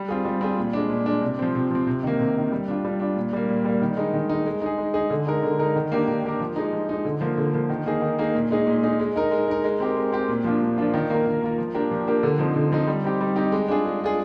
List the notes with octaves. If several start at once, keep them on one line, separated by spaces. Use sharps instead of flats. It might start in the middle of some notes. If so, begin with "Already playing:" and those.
Already playing: G3
C4 F4 G#4
G3
C4 F4 G#4
A#2
G#3 D4
A#2
G#3 D4
C3
F3 C4
C3
F3 C4
C3
D#3 A#3
C3
D#3 A#3
G3
D4 F4
G3
D4 F4
A#2
G3 A#3
A#2
G3 A#3
D#3
G#3 D#4
D#3
G#3 D#4
G#3
D#4 G#4
G#3
D#4 G#4
D3
G#3 D#4 A#4
D3
G#3 D#4 A#4
D#3
A#3 D4 G4 A#4
D#3
A#3 D4 G4 A#4
F3
G#3 D#4
F3
G#3 D#4
D3
F3 A#3
D3
F3 A#3
D#3
A#3 D#4 G#4
D#3
A#3 D#4 G#4
A#2
G#3 D#4 G#4
A#2
G#3 D#4 G#4
G#3
D#4 A#4
G#3
D#4 A#4
G#3
C4 G4 A#4
G#3
C4 G4 A#4
A#2
F3 A#3 D4 F4
A#2
F3 A#3 D4 F4
D#3
A#3 F4 A#4
D#3
A#3 F4 A#4
F3
A#3 D4 G4 A#4
F3
A#3 D4 G4 A#4
D3
F3 C4 D#4
D3
F3 C4 D#4
G3
C4 D#4 G4
G3
C4 D#4 G4
G#3
D4 F4 G#4
G#3
D4 F4 G#4